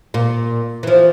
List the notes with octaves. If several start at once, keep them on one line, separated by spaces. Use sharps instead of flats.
A#2
E3 F3